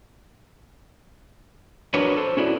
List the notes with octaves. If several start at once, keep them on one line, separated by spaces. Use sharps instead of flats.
D4 F#4 A#4 B4 C#5
A4 C5
C#4 E4 F#4 D5